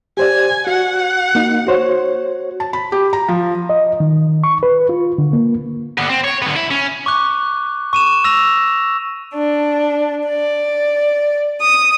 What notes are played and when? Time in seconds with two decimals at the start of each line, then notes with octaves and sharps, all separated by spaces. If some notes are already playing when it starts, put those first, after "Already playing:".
0.17 G4 C5 D5 G#5
0.67 F#4 F#5
1.35 A#3 D#4
1.67 F#4 C5 C#5
2.60 A5
2.73 B5
2.92 G4
3.13 A#5
3.28 F3
3.70 D#5
4.00 D#3
4.44 C#6
4.63 B4
4.89 F4
5.18 D3
5.33 A#3
5.98 D3 B3
6.10 C4
6.24 C#5
6.42 D3 B3
6.56 E4
6.71 C#4
7.06 C#6 D6 F#6
7.93 C#6 D#7 E7
8.24 E6 A#6 F7
9.35 D4
10.28 D5
11.62 D#6